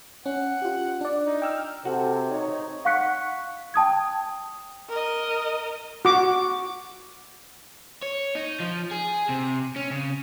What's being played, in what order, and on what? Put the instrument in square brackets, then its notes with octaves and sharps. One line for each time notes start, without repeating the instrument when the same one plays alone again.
[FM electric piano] C#4 [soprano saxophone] F#5
[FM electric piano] F4 G4
D4 D5
[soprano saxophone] D#4
[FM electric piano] G5 E6 F6
[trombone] C3 [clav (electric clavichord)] F#4 [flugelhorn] A4
[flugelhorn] D#4 [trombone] C#5
[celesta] F5 F#5 C#6 F#6 B6 C#7
G5 A5 D#6 G#6
[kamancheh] A#4 D#5
[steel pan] F#4 D6
[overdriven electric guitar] C#5
D#4
F3
G#4
C3
C#4
C#3